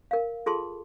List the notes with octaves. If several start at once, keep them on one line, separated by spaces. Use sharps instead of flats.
A#4 F5
F4 G#4 A4 A5 C6